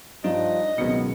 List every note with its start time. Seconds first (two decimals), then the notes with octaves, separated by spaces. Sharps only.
0.24 G2 F3 D#4 D#5
0.78 C#2 B2 D#3 F#3 B3 C4 C#7